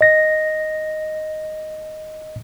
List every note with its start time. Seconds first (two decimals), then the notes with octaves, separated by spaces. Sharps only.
0.01 D#5 A#6